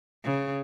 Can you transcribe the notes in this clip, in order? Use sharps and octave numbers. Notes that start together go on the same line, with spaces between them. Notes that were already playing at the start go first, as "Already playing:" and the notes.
C#3